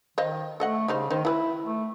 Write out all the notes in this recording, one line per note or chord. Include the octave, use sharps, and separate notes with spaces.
D#3 C5 D#5 F5
A3 A4 D#5 F#5
C#3 G3 D#4 C5
D#3 D#4 C5
E3 E4 G#4 B4
A3